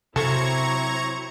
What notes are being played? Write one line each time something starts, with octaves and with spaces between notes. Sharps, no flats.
C3 F#3 C4 E4 A4 A#5 C#6 G#6